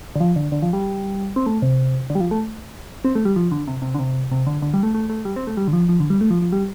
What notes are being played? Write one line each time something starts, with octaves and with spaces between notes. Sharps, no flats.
D3
F3
D3
D3
F3
G3
C4
A3
C3
D3
G3
F3
A3
C4
A3
G3
F3
D3
C3
C3
D3
C3
C3
D3
D3
G3
A3
A3
A3
G3
C4
A3
G3
D3
F3
F3
D3
G3
A3
F3
F3
G3